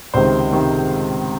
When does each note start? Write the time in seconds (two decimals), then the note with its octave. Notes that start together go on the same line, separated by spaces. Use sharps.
0.14 C#2 C3 D#3 C5
0.53 C3 D#3